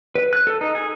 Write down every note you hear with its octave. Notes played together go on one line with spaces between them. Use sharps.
B4
F#6
A4
D#4
G#4